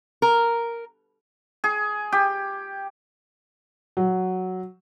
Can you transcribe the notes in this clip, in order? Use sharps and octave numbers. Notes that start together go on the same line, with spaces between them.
A#4
G#4
G4
F#3